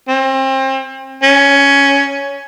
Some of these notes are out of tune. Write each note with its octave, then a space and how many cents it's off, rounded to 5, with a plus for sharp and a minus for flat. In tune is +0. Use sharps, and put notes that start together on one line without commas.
C4 +30
C#4 +10